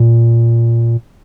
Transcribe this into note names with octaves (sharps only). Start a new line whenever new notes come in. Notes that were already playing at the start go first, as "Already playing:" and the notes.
Already playing: A#2